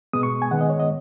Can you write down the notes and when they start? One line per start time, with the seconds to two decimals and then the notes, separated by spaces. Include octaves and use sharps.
0.13 B2 G#3 B3 D#6
0.23 C#6
0.42 G#5
0.51 D#3 G#3 B3 F#5
0.61 D#5
0.70 C#5
0.80 D#5